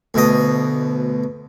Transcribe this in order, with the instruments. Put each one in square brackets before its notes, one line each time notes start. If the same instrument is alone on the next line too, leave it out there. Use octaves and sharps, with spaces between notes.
[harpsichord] D2 B2 D#5